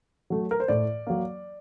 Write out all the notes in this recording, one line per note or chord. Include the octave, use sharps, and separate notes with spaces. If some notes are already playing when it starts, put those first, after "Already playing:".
F#3 A3
A#4
C5
A2 D5
F#3 A#3